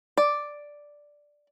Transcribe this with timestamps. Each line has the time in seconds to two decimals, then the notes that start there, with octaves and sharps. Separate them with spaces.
0.17 D5